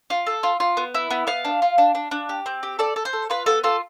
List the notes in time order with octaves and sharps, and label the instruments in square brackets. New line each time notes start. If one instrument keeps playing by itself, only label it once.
[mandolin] F4
A4
F4
F4
B3
E4
B3
B3 F5
D4
F4
D4
D4
D4
G4
C4
G4
A4 D5
A4
C5
A4
F4 B4
B3 A4
F4 A4